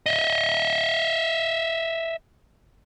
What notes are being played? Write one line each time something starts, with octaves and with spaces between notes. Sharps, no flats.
D#5 E5